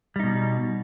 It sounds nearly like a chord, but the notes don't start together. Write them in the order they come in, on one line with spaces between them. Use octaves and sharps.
G3 D#4 B2